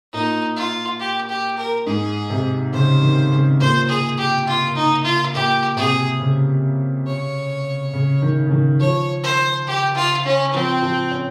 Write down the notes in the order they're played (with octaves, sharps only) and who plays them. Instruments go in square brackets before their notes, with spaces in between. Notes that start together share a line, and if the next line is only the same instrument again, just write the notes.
[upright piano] A#2 [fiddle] D#4
[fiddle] F4
G4
G4
A#4
[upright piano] G#2 [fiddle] G#4
[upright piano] C3
[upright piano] C#3 [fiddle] C5
[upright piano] D#3
C#3
[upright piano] A#2 [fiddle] C5
[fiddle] G#4
G4
F4
D#4
F4
[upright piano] A#2 [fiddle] G4
[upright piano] C3 [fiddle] G#4
[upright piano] C#3
[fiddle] C#5
[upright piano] C#3
D#3
C#3
D#3
[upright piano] F3 [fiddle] C#5
[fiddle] C5
G4
F4
C#4
[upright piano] F3 [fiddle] C4
[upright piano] F3
C#4